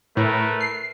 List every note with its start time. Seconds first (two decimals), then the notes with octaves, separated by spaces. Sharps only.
0.17 A2 A3 A#4 B4
0.61 C7